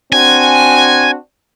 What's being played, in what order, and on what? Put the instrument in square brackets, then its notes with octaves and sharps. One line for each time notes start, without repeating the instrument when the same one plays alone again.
[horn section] C4 D4 F#4 [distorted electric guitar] G#5